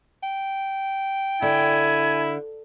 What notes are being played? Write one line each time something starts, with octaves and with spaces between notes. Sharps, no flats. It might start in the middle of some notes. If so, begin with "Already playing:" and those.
G5
D3 E4 G#5